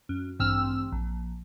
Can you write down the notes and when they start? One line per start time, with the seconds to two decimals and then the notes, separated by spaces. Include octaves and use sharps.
0.09 F#2
0.39 A1 G2 C4 E6 F6
0.92 A#1